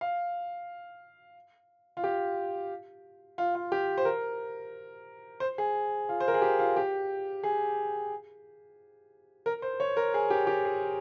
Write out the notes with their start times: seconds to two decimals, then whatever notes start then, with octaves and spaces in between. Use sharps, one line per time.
0.01 F5
1.97 F4
2.04 G4
3.38 F4
3.55 F4
3.72 G4
3.98 C5
4.05 A#4
5.40 C5
5.58 G#4
6.09 F4
6.20 C5
6.28 A#4
6.34 G#4
6.42 G4
6.59 F4
6.76 G4
7.44 G#4
9.46 A#4
9.62 C5
9.80 C#5
9.97 A#4
10.14 G#4
10.30 G4
10.47 G4
10.65 G#4